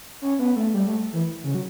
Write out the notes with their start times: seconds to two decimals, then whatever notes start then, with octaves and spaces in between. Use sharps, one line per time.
0.22 C#4
0.39 B3
0.56 A3
0.74 G3
0.87 A3
1.13 E3
1.43 C#3
1.55 F#3